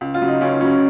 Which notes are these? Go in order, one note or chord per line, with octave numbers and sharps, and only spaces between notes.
C#2
F4
C#3 F#3
D#4
C#2 C#4
C#3 F#3 C#4